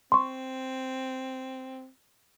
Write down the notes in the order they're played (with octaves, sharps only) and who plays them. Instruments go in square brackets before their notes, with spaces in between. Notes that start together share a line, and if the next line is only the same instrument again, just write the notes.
[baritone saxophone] C4 [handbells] C6 C#6